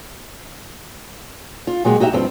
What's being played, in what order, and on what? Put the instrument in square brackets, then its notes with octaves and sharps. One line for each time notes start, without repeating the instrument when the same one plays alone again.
[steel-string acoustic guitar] F4
A#2 F#3 G#3 F#4 G4
D#4 F#4 G4 E5
G2 F3 C4